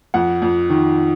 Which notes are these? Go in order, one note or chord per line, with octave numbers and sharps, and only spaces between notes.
F2 F#5
F2
D#3